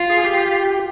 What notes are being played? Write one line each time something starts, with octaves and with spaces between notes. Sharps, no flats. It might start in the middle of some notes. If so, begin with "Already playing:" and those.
Already playing: F4
G#4
G4